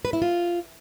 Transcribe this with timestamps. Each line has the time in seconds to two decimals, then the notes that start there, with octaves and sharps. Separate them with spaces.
0.05 B4
0.13 E4
0.22 F4